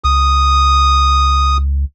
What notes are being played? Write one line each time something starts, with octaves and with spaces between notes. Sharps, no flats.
C#2 D#6